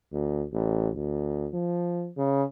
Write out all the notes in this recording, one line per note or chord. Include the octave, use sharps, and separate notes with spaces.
D2
A1
D2
F3
C#3